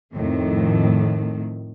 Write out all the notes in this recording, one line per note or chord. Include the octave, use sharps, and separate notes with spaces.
F2 A2 D#3